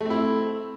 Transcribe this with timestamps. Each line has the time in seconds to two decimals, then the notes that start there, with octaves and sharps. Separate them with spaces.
0.01 A3
0.05 C4
0.10 E4